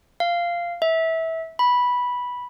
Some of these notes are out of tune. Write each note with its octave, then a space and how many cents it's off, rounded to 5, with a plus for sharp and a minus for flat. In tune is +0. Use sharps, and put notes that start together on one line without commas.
F5 -10
E5 -20
B5 -10